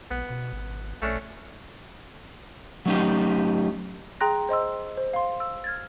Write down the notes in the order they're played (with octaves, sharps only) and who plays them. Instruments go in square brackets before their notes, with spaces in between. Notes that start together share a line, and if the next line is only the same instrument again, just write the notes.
[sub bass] A#1 [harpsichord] B3
[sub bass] B2
G#1
[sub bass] A#1 [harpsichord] A3 C#4 D4
[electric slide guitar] F#3 A3 C#4 D#4 G4
[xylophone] G#4 G5 A#5 C6 F#6 A#6
C5 D#5 C6 E6
C5
F5 C6
E6
F6 G#6 A6